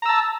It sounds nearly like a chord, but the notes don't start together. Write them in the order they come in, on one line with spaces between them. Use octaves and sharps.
A#5 E6 A5